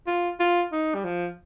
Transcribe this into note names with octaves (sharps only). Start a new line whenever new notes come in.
F4
F4
D#4
G3
F3